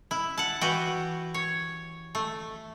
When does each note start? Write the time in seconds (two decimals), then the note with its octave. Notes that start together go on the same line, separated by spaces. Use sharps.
0.11 E4
0.38 F#5 A5
0.61 E3 F#4 G4
1.34 C#5
2.15 A3